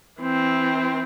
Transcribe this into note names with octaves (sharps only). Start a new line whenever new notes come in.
E3 C4